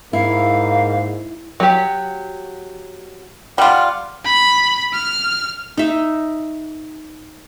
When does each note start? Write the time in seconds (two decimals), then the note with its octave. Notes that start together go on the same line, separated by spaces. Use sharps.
0.13 G#2 A#3 E4 F5
1.60 F#3 F#4 G4
3.58 G3 F4 F#5
4.25 B5
4.93 F6
5.78 D#4 E5